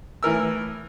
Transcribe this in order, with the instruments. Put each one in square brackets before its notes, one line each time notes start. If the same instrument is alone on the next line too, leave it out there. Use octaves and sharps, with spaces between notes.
[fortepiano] A2 E3 A#4 E6